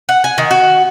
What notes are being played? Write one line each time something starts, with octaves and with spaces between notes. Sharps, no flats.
F#5
G#5
D#3
F#4